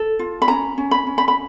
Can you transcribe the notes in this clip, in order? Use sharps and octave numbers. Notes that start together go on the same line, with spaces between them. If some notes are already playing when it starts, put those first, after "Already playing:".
Already playing: A4
F4
B5
C#4 A#5
C#4
B5
C#4
B5
B5